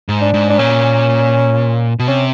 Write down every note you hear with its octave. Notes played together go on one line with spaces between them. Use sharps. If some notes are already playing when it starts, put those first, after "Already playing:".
G#2
D4
G#2
D4
A#2 C#4
B2
C3 C#4